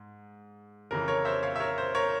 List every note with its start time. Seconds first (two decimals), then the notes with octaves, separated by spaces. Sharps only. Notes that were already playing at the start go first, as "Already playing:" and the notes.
Already playing: G#2
0.91 F2 C#3 E3 A#4
1.08 A#4 C#5
1.25 C5 E5
1.43 C#5 F5
1.56 E5
1.60 A#4 C#5
1.78 C5
1.95 A#4 C#5